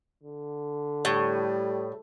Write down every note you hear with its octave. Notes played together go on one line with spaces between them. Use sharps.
D3
A2 G3